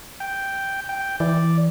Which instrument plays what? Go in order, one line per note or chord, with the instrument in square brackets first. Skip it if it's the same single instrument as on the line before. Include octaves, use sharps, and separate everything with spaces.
[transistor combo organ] G5
G5
[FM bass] E3 [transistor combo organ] D5